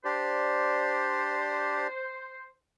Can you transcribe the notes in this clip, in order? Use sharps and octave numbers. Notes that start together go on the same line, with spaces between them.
D4 G4 C5 D5